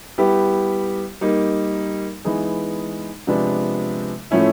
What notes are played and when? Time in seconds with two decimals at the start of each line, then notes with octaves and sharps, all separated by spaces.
0.18 G3 B3 E4 G4
1.21 G3 A#3 D#4
2.25 E3 G#3 B3 D#4 G#4
3.27 C3 F3 G#3 B3 D4
4.31 A2 F3 A3 C#4 E4